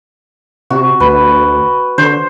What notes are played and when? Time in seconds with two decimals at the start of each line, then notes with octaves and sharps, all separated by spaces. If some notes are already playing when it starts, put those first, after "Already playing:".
0.70 C3 F#4
1.00 D2 B4
1.98 D3 C5